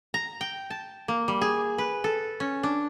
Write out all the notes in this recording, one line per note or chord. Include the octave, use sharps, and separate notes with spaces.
A#5
G5
A5
A#3
G3
G#4
B4
A4
C#4
D4